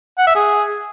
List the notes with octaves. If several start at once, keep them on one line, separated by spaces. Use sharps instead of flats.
F#5
E5
G#4